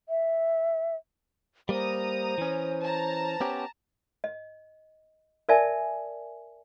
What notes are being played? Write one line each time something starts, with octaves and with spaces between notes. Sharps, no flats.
E5
G3 A#3 C5 A#5 D#6
E3 C#4
A5 A#5
B3 C#4 G4
D#5
A#4 D5 E5 G#5 A5